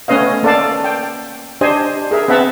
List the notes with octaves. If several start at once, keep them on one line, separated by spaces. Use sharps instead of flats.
A3 B3 C#4 B4 D#5 F5
A#3 A4 D5 F5 A5
G5
D4 G4 C5 D#5 G#5
G#4 A#4 E5
B3 C4 E5 F#5 A5 A#5